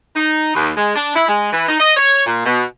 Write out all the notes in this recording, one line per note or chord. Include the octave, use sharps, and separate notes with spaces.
D#4
D#2
G#3
D4
E4
G#3
E3
D#4
D#5
C#5
A#2
B2